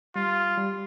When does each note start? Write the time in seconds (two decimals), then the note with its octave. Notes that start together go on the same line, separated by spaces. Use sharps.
0.15 G3 F4
0.58 G3